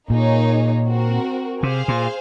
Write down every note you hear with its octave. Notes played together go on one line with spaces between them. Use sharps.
A#2 A#3 D#4 G#4 C#5
C4 F#4 A#4
C3 G#4 C5 F5
A#2